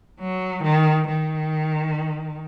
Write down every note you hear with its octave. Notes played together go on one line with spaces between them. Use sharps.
F#3
D#3
D#3